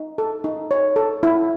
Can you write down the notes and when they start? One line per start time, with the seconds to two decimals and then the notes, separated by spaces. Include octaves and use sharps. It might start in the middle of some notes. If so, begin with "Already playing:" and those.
Already playing: D#4
0.18 A4
0.44 D#4
0.71 C#5
0.96 A4
1.23 E4